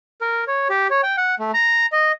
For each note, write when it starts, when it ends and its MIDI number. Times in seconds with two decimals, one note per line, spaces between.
0.21 0.44 70
0.47 0.68 73
0.70 0.87 67
0.90 1.01 73
1.03 1.16 79
1.17 1.35 78
1.39 1.51 57
1.54 1.86 82
1.92 2.12 75